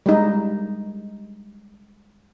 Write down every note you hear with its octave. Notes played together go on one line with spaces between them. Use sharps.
G3 G#3 D#4